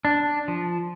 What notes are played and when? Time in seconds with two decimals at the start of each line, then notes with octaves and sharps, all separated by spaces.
0.05 D4
0.48 F3